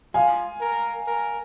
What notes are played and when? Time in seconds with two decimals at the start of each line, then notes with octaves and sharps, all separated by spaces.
0.14 F4 F5 G#5
0.61 A#4
1.07 A#4